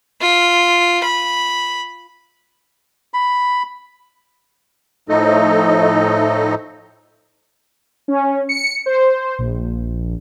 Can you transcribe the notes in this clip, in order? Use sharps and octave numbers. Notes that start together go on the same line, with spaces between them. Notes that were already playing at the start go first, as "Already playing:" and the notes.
F4
B5
B5
A2 F3 A3 D#4 A4 D#5
C#4
C#7
C5
A#1